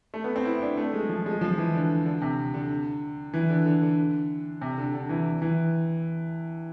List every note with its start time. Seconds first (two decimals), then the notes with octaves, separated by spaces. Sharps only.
0.14 A3
0.24 B3
0.36 C4
0.45 E4
0.62 D4
0.77 A3
0.94 G#3
1.09 F3
1.26 G#3
1.41 F3
1.58 E3
1.74 D3
2.05 D3
2.22 C3
2.54 D3
3.34 E3
3.50 D3
3.66 D3
3.82 D3
4.61 C3
4.78 D3
4.93 D3
5.09 E3
5.42 E3